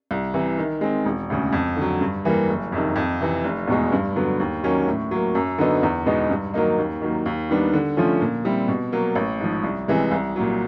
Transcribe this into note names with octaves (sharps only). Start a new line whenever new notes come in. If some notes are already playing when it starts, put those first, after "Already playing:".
C2
C3 E3
D#3
G#3 C4
E1
D2 C#3
F2
D3 F#3
G2
E3 G3 A#3
F#1
F2 C3 D#3
F2
C3 E3
F1
E2 B2 G#3
G2
D3 F#3 B3
D#2
D#3 F#3 A#3 C#4
A2
F#3 A#3
F#2
D3 F#3 B3 D#4
E2
B2 G#3 B3 D#4
G2
D#3 F#3 A#3 D#4
D#2
D#3 F#3 A#3
D#2
D#3 G3 B3 D4
D3
F3 A3 C#4 F4
A#2
G3 C4 E4
B2
F#3 A#3
A1
G#2 F3
C2
C3 E3 G#3
C2
A#2 F#3